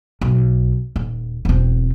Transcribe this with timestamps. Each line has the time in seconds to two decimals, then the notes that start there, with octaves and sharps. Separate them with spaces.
0.21 B1
0.96 D#1
1.45 E1 C4